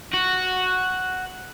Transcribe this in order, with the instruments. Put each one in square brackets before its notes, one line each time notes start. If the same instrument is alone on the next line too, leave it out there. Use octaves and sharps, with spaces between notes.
[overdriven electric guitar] F#4